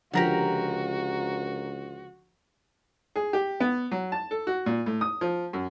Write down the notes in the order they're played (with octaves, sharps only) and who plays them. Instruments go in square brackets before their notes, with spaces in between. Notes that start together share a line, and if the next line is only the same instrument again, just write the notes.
[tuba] C#2 [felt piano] D3 F3 A#6 [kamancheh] F#4 [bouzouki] G4 A#4 F#5
[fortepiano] G#4
G4
B3
F#3
A5
A4
F#4
A#2
A2
D#6
F3
F#2